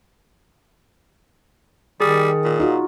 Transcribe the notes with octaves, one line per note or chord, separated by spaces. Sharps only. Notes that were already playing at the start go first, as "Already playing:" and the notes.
D#3 G3 G#4
A#2
D#4 F4 F#4